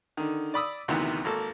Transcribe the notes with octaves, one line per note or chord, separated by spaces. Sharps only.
D3 D#3
D5 B5 D#6 E6
D2 C3 D#3 E3 B3
G#1 A#3 A4